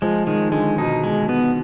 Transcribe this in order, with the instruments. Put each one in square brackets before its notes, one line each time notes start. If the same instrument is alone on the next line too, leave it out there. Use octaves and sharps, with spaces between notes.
[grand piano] F3 [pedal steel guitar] G#3
[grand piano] D#3 [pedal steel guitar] G#3
[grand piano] D3 [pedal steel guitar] G#3
[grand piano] B2 [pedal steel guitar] D#4
[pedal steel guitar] G#3
B3